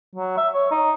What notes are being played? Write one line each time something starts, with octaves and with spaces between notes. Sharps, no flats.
F#3
E5
C#5
D#4